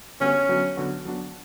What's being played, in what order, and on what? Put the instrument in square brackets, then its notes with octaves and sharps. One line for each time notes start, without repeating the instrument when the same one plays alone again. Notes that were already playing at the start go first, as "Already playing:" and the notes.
[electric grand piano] D3 G3 B3 F#4 [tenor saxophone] C#4
[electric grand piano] D3 F#3 B3 F#4
D3 F#3 B3 F#4
F#3 B3 D4 F#4